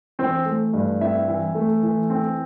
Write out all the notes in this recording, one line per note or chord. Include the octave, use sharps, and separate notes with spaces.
E3 C4 C5
A3
G2
C4 E4 E5
E3
A3
E3
C4